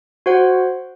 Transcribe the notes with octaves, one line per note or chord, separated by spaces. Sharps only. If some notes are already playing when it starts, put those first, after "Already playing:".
F#4 C5 F#5